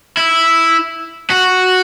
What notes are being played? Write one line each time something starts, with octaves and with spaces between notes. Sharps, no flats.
E4
F#4